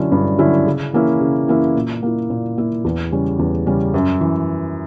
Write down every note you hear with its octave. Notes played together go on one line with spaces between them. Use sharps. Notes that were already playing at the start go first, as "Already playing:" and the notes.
Already playing: D3 F#3 C#4 E4
G2
D3 F#3 C#4 E4
C#3
E3 A#3 C#4 E4
C#3
E3 A#3 C#4 E4
A#2
A#3 E4
A#2
A#3 E4
E2
C#3 G3 C#4
E2
C#3 G3 C#4
F#2
E3